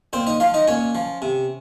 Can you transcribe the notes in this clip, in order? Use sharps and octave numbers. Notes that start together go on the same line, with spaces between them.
A#2 C4 C5
D#4 D#5
F3 F4 F5
D#4 D#5
A#2 C#4 C#5
F3
C3